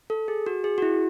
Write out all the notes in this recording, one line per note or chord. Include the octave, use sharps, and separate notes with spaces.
A4
G#4
F#4
G#4
F#4
E4